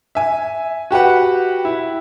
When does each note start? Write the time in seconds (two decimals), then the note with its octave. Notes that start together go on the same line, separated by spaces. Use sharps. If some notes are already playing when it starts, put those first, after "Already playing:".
0.15 E5 G#5
0.91 F#4 G4 B4 F#5
1.65 E4